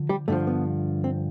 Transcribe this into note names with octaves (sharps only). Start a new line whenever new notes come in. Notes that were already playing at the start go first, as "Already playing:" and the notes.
Already playing: D3 F3
G3
G2 D3 F3 A3
B3
C4